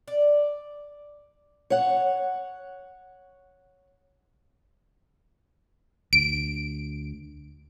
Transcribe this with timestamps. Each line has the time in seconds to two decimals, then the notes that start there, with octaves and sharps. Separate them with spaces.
0.08 D5
1.70 C#5 F#5
6.13 D2 D7